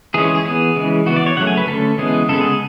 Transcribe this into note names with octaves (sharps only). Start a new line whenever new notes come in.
E3 G#3 C#4 G#4
G#4
G#4
E3 B3 G#4
C#3 E3 G#3
E3 B3 F#4
D5
C#5
C#3 F#3 A3 F#5
G#5
B4
D3 A3 C#4 A4
C#3 E3 G#3 B3 G#4
C#3 G#3 B3 A4
G#4